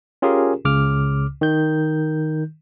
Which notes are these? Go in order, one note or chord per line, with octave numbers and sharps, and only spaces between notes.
C#4 F4 G4 G#4 A#4
C#2 C#3 D6 F6
D#3 G6